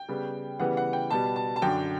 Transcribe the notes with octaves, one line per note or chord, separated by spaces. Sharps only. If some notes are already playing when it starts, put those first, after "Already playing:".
Already playing: G5
C#3 G3 B3
C#3 E3 G3 B3 F#5
F#5
G5
B2 G3 B3 A5
A5
A5
F#2 D3 F#3 G5